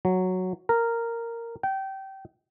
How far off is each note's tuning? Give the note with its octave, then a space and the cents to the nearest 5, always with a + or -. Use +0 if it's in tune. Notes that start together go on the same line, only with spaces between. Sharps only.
F#3 -5
A#4 -10
G5 -25